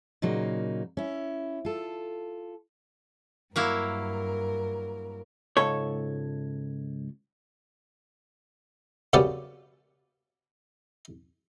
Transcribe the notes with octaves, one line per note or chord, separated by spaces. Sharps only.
A#2 C#3 F#3 A#3 D#4
C#4 E4
F4 A4
G2 F#3 A#3 E4 A#4
C#2 G#2 A4 C#5
F#2 C#3 B3 G4 D5 F#5